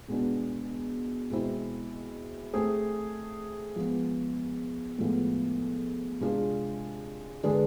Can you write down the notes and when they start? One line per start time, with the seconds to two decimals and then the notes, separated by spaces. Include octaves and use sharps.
0.08 B2 G#3 B3 D4
1.30 B2 G#3 C4 E4
2.53 A3 C4 G#4
3.76 F3 G#3 B3
4.98 A2 F3 G#3 B3
6.21 C3 G#3 D4 F4 G#4
7.43 D3 G#3 D4 G#4 B4